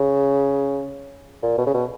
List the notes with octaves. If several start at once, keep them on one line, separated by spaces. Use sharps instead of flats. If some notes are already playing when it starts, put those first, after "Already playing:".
Already playing: C#3
A#2
B2
C#3
B2